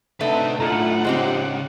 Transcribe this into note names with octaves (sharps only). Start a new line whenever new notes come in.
D3 A3 C4 D#4 B4 D#5
D2 A2 D#4 F4 F#5 A#5
C#3 G#3 C4 G4 C5